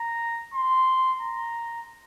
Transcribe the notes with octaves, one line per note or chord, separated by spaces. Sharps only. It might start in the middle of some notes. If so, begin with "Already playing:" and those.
Already playing: A#5
C6
A#5